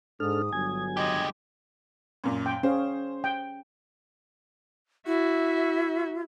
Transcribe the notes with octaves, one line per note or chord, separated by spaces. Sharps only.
G#2 D4 A4 D#6 F6
G1 G2 F#3 G#5 G#6
G#3 G4 D#5
F#2 A#2
G5
C#4 G#4 C5 F5
G5
E4 F#4 E5